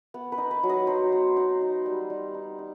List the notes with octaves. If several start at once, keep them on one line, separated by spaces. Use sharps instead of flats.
B3
B4
D#4
B4
F#3
D#5
F#3 C5
B3
D#4
D#4
G3
G3
D#4
D#4